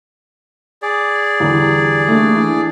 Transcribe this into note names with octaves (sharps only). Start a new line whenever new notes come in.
G#4 D5
E2 D3 G3
A3 A#3 D4
E3 D4